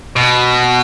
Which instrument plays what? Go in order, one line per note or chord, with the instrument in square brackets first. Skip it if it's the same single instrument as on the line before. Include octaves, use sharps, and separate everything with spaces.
[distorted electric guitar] B2